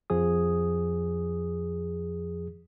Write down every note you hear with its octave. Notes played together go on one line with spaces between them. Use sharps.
F2 F3 G#4 D#6